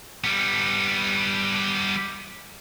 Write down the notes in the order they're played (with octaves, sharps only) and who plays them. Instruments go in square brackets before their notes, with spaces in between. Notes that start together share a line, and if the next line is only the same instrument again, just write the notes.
[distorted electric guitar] G3 B3